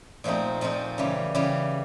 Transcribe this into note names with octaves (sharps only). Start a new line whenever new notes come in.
A#2 F3 A3 C4 D#4
A#2 F3 A3 C4 D#4
C#3 E3 G3
C#3 E3 G3